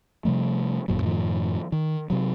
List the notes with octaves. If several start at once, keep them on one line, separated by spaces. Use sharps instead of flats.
C3 F3 G3 A3
G#1 F#2 A#2 F#3
F#2 A2 D#3 F3
D#3
C3 F#3